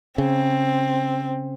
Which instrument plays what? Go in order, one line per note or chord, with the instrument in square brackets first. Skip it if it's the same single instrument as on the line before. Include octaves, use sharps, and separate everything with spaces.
[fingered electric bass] C#3 [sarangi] C4